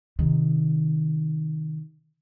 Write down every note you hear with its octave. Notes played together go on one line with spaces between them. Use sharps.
C3 D#3